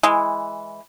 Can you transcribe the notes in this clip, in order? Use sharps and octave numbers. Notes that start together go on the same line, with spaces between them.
E3 G#3